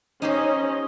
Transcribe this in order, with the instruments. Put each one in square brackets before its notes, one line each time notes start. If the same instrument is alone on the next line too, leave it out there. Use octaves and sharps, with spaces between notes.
[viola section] C#4 D#5 [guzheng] D#4 G4 C5